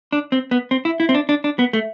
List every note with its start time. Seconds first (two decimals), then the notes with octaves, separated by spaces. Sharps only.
0.12 D4
0.32 C4
0.51 B3
0.71 C4
0.85 E4
1.00 E4
1.09 C4
1.15 D4
1.29 D4
1.44 D4
1.59 B3
1.73 A3